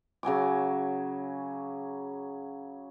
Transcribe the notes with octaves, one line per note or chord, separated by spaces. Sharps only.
C#3 F#3 G#5 D6